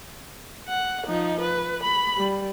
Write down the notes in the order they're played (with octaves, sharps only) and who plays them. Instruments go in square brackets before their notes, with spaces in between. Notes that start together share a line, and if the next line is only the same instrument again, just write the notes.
[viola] F#5
F3 D#4
B4
B5
G3